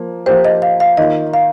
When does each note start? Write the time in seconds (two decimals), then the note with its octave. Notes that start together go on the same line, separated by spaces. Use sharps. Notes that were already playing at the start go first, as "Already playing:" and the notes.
Already playing: F3 A#3
0.26 F3 A#3 G4 C5
0.45 D#5
0.62 F5
0.80 F5
0.97 D#3 A#3 F4 D#5
1.34 F5